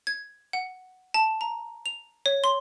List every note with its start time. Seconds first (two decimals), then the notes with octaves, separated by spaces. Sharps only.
0.07 G#6
0.53 F#5
1.14 A5
1.41 A#5
1.86 F7
2.26 C#5
2.44 C6